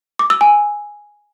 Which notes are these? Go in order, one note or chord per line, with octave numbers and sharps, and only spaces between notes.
D6
E6
G#5